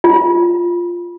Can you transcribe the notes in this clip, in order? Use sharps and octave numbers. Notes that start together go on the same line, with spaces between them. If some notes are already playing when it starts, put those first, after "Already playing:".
F4